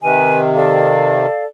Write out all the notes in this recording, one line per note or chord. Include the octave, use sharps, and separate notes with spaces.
C3 D#3 B4 G#5
A4 D5 F5